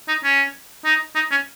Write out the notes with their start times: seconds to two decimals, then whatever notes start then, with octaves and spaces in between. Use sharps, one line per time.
0.08 D#4
0.24 C#4
0.85 D#4
1.15 D#4
1.31 C#4